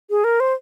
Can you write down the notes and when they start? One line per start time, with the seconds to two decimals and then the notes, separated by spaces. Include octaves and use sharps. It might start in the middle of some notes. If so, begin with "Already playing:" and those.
0.10 G#4
0.24 A#4
0.40 C5